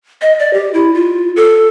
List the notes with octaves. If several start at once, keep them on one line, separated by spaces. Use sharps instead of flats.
D#5
D5
G4
E4
F4
A4